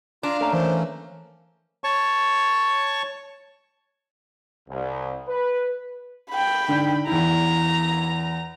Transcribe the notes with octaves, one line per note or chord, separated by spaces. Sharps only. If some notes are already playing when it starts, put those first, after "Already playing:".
D4 F4 F5 A#5
A3 A#3 C#4 A#4 A#5
E3 C5
C#5 A5 C#6
C2
B4
G5 B5
G#2 D3
E2 E4 A#5